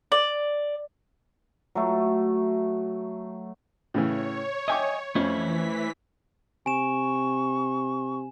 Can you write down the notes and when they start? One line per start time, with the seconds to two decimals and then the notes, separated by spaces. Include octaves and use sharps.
0.12 D5
1.75 F#3 A3
3.94 A2 C#3 E3 C#5
4.68 D#5 E5 G5 G#5 D6
5.15 F2 E3 A3 C#4 E4 C5 B6
6.66 C3 G#5 C#6 E7